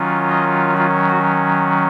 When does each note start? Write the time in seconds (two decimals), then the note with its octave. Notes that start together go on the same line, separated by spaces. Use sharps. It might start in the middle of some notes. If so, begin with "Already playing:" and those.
Already playing: D#3 F#3 C#4 F4
0.30 D#5
0.77 F4
1.09 F#4